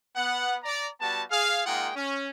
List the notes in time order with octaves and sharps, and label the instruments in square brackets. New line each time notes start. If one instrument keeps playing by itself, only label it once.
[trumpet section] B3 F#5
D5 A#5
G3 B3 F#4 A5
G#4 F5
G#3 A#3 D#4 F4 F#5 G5
C#4